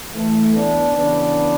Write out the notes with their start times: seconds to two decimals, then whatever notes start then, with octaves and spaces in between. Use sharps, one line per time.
0.15 A2 E3 A3
0.55 B3 D4
0.95 C#3 E3 B3 D4